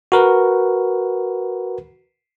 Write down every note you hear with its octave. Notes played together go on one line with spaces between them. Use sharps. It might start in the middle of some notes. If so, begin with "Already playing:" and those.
F#4 A#4 B4